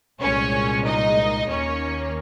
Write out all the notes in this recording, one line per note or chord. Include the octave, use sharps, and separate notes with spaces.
C2 A#2 G#3 C#4 C#5
D#4 D#5
D#2 D#3 A#3 C#4 C#5